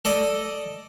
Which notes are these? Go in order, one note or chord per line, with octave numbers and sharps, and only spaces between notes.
A4 D5 D#5